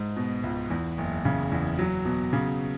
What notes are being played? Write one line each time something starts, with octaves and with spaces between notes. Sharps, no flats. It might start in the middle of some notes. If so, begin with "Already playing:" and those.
Already playing: G#2
B2
C#2
E2
F#1
C#3
E2
F#3
B2
C#3